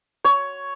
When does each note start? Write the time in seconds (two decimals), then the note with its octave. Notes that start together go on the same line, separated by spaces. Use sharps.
0.25 C#5